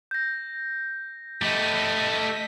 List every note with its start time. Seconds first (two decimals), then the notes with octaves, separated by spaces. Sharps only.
0.11 G6 A#6
1.42 A3 G4 D#5 B6